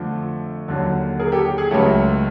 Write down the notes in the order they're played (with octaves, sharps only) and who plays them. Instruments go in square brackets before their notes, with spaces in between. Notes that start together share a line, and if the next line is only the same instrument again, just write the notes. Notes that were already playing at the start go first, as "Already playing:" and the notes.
Already playing: [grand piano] F2 D3 F3 A3
D#2 D3 F#3
G#4 A#4
G4 A4
G4
G#4
C#2 C#3 F#3 A3 G4 A4